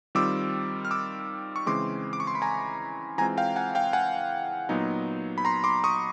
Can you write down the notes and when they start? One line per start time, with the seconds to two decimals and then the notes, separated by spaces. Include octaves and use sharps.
0.15 D#3 G3 C4 F4 D6 E6
0.85 F6
0.91 D6 E6
1.56 C#6
1.66 C#3 E3 G#3 C4 C6 D6
2.13 D6
2.20 C#6
2.27 C6
2.35 B5
2.42 G#5 A#5
3.18 E3 G#3 C4 F4 G#5 A#5
3.37 F5 G5
3.56 F#5 G#5
3.75 F5 G5
3.93 F#5 G#5
4.69 A#2 F#3 B3 D#4
5.38 B5
5.45 A#5 C6
5.64 C6 D6
5.84 C#6 D#6